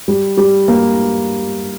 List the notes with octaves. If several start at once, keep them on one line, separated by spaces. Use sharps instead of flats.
G3
G3
A#3